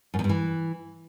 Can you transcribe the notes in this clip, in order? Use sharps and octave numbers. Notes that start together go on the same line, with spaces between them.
F#2
E2
G2
E3